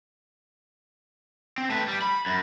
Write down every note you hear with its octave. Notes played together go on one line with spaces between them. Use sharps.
C4
A3 B4
G3
B5
F#2